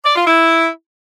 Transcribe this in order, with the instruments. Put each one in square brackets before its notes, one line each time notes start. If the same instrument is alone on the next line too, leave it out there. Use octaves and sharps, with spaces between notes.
[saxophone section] D5
F4
E4